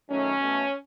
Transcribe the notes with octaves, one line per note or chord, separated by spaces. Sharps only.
F#2 D#3 F#3 A3 C#4
B2 A3